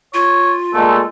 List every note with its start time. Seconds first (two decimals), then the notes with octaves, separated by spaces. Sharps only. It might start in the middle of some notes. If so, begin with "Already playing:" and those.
0.14 F4 C#5
0.73 A#2 G#3 A3 A4